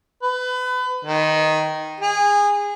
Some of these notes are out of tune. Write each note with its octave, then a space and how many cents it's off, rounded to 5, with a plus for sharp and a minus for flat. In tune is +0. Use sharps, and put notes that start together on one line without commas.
B4 +30
D#3 +0
G#4 -20